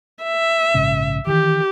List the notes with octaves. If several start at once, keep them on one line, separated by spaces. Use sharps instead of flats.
E5
A#1 G#2 C#3
D#3 E3 G4